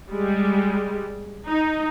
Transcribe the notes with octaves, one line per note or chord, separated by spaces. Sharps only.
G3 G#3
D#4